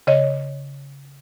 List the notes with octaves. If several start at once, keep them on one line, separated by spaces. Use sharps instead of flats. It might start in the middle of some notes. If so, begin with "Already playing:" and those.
C#3 C#5 D#5